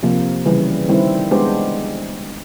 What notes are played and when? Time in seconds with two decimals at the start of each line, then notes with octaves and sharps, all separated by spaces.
0.03 C3 F3 A#3
0.45 C#3 E3 G3
0.88 D#3 G3 C4 E4
1.31 G#3 B3 D4 G4 C5